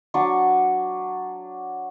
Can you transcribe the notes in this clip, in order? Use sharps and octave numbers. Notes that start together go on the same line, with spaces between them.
F#3 D4 C#6